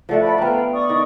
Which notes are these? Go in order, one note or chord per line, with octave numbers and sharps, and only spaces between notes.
F3 A3 D4 D5 F#5
A4 D5 B5
B3 D4 F4 G5 A#5
D5 C#6 D#6
D#3